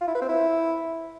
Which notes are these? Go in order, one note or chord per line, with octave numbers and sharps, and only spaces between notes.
F4
E4
B4
C4
E4